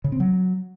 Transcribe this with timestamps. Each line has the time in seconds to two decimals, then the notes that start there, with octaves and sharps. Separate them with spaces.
0.04 C#3
0.12 C4
0.20 F#3